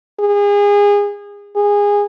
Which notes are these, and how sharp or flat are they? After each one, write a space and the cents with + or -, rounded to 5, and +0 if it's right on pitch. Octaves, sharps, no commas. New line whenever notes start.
G#4 -30
G#4 -20